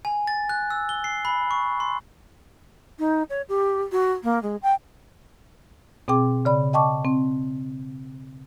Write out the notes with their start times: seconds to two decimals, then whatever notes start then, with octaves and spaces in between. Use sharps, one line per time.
0.05 G#5
0.27 A6
0.49 F#6
0.70 E6
0.89 G7
1.04 C7
1.25 B5
1.51 C#6
1.80 C6
2.99 D#4
3.30 C#5
3.49 G4
3.92 F#4
4.24 A#3
4.42 G#3
4.62 G5
6.08 B2 C4 G#4 G5 D6
6.45 C#3 D5 B5
6.73 D#5 G5 A5 C#6 D6
7.04 C4